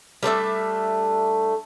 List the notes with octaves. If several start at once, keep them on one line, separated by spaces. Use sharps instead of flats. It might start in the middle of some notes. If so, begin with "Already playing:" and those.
G3 A3 D4 E5